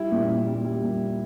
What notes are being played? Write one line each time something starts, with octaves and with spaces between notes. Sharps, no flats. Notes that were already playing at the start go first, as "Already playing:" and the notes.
Already playing: G3 E4
A#2
A#2
G3
G3
A#2